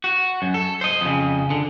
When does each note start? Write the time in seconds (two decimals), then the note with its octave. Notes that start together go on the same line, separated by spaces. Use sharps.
0.04 F#4
0.42 F#2
0.54 A4
0.81 C5 D#5
1.01 F2 C#3
1.50 D3